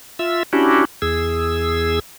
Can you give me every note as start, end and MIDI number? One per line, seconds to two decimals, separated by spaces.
0.19 0.43 65
0.19 0.43 76
0.19 0.43 88
0.53 0.85 61
0.53 0.85 62
0.53 0.85 64
0.53 0.85 66
0.53 0.85 67
1.02 1.99 40
1.02 1.99 68
1.02 1.99 88